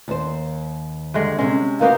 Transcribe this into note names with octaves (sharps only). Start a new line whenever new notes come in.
D#2 C5
G2 D3 G#3
C3 G#3 C#4
A#3 B3 D#4 F#4 G4 A#4 F5